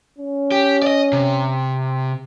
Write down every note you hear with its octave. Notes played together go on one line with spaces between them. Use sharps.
C#4
G4
D5 D#5
C3